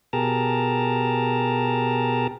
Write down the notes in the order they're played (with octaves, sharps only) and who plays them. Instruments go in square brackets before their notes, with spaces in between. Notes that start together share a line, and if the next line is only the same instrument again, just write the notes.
[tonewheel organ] B2 G4 G#4 A#4 A5 A#5